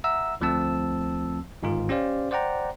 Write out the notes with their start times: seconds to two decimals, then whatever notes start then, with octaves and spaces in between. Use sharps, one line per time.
0.04 E5 F#5 A#5 E6
0.41 D2 F3 A3 C4 A5 E6
1.63 G1 G#2 D#3 F4
1.89 C#4 G4 C5 D5 F5
2.31 C5 D5 F#5 G5 A#5